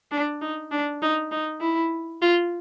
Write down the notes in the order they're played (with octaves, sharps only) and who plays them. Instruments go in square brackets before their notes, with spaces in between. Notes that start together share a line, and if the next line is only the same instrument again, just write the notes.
[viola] D4
D#4
D4
D#4
D#4
E4
F4